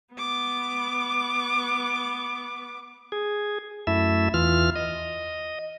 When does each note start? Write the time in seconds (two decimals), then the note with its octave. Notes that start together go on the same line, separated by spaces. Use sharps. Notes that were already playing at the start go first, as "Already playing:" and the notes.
0.14 B3 D6
3.12 G#4
3.87 F#2 A3 E4 E5
4.34 E2 E3 F4 F6
4.76 D#5